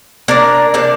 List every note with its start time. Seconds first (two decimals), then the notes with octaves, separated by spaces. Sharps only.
0.28 A#3 D4 A#4 D5
0.74 C3 A#3 D4